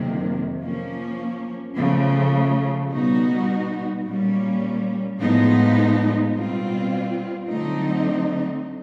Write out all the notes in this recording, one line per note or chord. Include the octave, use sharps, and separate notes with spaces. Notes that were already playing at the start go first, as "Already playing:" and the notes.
Already playing: F2 C3 D#3 F#3 A#3
F3 A#3 C#4
C#3 F3 A3
B2 G3 B3 D#4 F#4
A#2 G3 A#3 C#4
A2 F3 G#3 B3 D#4
B2 G3 C4 F4
D3 F#3 A3 C4 D#4